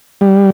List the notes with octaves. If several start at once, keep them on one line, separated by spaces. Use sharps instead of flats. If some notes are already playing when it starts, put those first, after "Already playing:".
G3